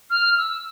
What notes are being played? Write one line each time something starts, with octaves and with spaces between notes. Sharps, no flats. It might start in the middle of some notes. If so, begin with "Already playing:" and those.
F6
E6